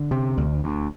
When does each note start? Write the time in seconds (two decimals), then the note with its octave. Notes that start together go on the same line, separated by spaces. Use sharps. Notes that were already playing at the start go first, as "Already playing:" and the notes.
Already playing: D3
0.11 C3
0.37 D2
0.64 D2